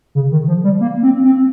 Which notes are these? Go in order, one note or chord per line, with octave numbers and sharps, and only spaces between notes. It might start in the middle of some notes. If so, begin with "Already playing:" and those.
C#3
D#3
F3
G3
A#3
C4
C4